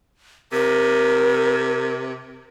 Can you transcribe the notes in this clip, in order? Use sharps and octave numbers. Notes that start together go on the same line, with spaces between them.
C3 A#4